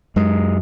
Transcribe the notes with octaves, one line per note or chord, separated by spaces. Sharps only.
F#2 G#3